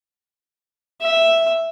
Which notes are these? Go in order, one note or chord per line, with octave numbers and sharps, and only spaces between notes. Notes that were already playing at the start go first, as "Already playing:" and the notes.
E5